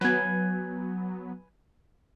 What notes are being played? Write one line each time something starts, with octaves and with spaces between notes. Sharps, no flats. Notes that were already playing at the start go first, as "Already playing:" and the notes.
F#3 B3 B4 G#5